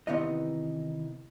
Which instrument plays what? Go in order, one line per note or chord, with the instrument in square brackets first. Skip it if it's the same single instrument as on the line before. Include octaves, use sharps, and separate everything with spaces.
[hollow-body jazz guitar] C3 D#3 E3 B3 D#4 D#5